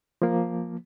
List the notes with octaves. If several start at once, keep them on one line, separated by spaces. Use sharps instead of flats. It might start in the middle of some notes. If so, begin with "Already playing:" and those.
F3 A#3